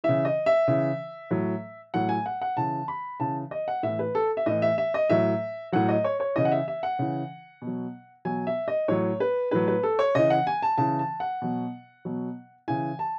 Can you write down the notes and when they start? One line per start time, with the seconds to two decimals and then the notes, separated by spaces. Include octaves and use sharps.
0.04 C#3 E3 E5
0.25 D#5
0.46 E5
0.68 C#3 E3
1.31 A2 F#3
1.94 A2 F#3 F#5
2.09 G#5
2.26 F#5
2.42 F#5
2.57 C#3 E3 A5
2.88 B5
3.20 C#3 E3 A5
3.51 D#5
3.68 F#5
3.83 A2 E3 E5
3.99 B4
4.15 A4
4.37 E5
4.46 A2 E3 D#5
4.62 E5
4.78 E5
4.94 D#5
5.10 A2 F#3 E5
5.72 A2 F#3 F#5
5.89 D#5
6.04 C#5
6.20 C#5
6.36 C#3 E3 D#5
6.45 F#5
6.52 E5
6.68 E5
6.83 F#5
6.99 C#3 E3
7.62 B2
7.67 F#3
8.25 B2 F#3 G#5
8.47 E5
8.68 D#5
8.88 A2 F#3 C#5
9.20 B4
9.51 A2 F#3 B4
9.68 B4
9.83 A4
9.99 C#5
10.15 C#3 E3 D#5
10.30 F#5
10.47 G#5
10.63 A5
10.78 C#3 E3 A5
10.99 A5
11.20 F#5
11.42 B2 F#3
12.05 B2 F#3
12.68 C#3 E3 G#5
12.99 A5